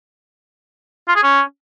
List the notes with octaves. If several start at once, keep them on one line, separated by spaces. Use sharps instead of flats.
F4
G#4
C#4